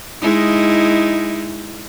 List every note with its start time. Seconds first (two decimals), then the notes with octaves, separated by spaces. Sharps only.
0.21 G#3 D#4 E4